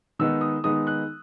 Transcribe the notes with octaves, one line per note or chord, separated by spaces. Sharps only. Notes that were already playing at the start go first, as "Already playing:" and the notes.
D#3 G#3 B3 D#4 E6
D#6
D#3 G#3 B3 D#4 D#6
F#6